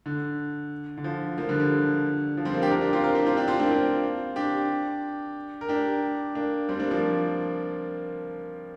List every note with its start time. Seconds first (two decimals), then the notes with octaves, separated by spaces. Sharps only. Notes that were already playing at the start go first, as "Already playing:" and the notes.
0.06 D3
0.98 D3
1.04 F3
1.38 F3 A#3
1.49 D3 G3
1.60 D3
2.37 F3
2.45 G3 C4
2.54 F3 A#3
2.62 D4 G4
2.71 F4 A#4
2.81 D4 G4
2.93 C4 F4
3.04 F4 A#4
3.15 D4 G4
3.26 C4 F4
3.37 D4 G4
3.48 C4 F4
3.59 A#3 D4
3.70 C4 F4
4.36 D4 G4
5.61 A#4
5.69 D4 G4
6.35 A#3 D4
6.69 G3 C4
6.80 A#3 D4
6.91 F3 A#3